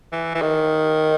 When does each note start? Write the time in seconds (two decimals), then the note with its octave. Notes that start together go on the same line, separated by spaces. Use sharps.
0.12 E3
0.34 E3
0.42 D#3